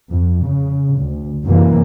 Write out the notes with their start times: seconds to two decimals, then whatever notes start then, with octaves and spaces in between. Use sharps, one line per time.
0.12 F2
0.45 C#3
1.00 D2
1.45 F#2 C3 E3 A#3